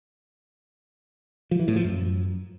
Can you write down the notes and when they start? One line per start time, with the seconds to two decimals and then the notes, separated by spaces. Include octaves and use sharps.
1.51 F3
1.60 E3
1.68 A2
1.76 F3
1.84 F#2